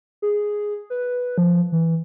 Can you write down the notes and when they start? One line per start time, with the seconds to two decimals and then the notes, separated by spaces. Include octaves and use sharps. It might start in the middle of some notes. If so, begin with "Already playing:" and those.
0.22 G#4
0.90 B4
1.38 F3
1.72 E3